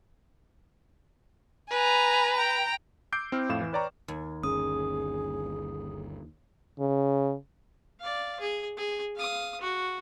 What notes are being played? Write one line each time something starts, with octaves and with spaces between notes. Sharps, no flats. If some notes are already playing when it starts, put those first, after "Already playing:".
B4 G#5 A#5
G5 A#5
D6 E6 G6 C7 D7
C4 E4 F6
F2 A2 F5 E7
E3
B4 C#5 D5 G5 A#5 C#6
D#2
G1 C#4 G#4 D#6
C#3
D5 F5
G#4
G#4
F5 D#6
F#4